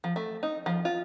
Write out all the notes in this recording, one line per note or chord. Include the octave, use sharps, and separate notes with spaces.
F3
A3
D#4
F3
F4